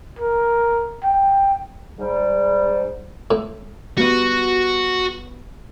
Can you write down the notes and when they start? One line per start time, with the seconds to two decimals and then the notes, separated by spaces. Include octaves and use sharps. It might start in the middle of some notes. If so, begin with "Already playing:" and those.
0.19 A#4
1.03 G5
1.99 G#2 G3
3.31 A2
3.98 G3 B3 F#4 D#7